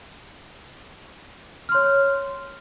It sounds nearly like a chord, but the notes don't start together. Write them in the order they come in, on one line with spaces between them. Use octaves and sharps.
F6 C6 C#5